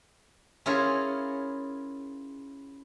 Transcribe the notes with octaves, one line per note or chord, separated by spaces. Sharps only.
C#4 E4 F4 G#4 A#4 C#5